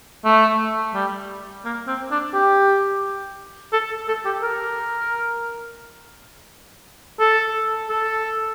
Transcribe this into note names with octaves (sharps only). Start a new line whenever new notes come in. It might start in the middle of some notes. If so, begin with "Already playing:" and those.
A3
G3
A#3
C4
D4
G4
A4
A4
G4
A#4
A4
A4